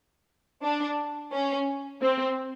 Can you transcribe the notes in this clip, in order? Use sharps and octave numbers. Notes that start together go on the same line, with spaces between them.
D4
C#4
C4